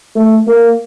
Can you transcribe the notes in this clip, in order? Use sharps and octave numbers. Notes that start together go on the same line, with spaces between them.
A3
A#3